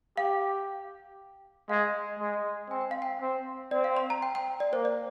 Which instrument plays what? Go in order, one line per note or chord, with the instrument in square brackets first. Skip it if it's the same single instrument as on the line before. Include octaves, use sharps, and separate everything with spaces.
[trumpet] G4 [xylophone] F5
[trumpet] G#3 [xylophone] F5
[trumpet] G#3
[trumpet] C4 [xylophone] G#5
[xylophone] G5
F5
G5
[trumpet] C4
[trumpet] C4 [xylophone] D5
[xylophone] F5
C6
A#5
G5
G5
D5
[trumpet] A#3 [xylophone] C5
[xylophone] D5